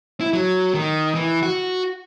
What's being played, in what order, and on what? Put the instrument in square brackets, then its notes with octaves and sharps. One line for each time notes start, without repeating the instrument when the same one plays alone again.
[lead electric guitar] E4
F#3
D#3
E3
F#4